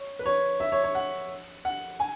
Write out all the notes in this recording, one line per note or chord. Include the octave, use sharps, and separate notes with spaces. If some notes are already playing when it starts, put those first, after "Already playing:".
Already playing: C#5
B4
C#5
E5
C#5
C#5
F#5
F#5
G#5